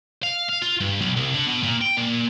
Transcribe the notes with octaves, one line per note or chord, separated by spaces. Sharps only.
F5
F5
F4
G2
B1
C2
D3
B2
A#2
G5
A#2